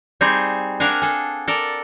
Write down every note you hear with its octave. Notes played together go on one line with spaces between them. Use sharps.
G3 C4 D#4 G#4 G#5
D4 A#4 F5 F#5 G#5
G#4 A4
A4 A#4 D5